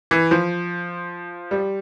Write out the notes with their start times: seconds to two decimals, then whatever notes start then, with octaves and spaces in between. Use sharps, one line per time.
0.11 E3
0.31 F3
1.51 G3